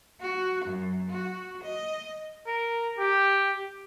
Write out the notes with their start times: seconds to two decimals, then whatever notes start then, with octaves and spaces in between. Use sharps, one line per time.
0.21 F#4
0.64 F#2
1.10 F#4
1.63 D#5
2.47 A#4
2.98 G4